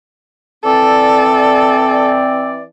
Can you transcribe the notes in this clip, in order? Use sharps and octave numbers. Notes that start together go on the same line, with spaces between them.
E3 C4 A4 D5